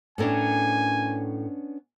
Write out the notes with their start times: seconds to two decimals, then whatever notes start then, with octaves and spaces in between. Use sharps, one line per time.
0.18 A2 B3 C#4 D4 A4 A#4 G#5